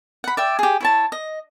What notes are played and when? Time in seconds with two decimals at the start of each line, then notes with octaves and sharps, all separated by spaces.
0.24 F#5 B5
0.37 D5 E5 G5
0.59 G4 G#4
0.80 E4 C#5 A5
1.12 D#5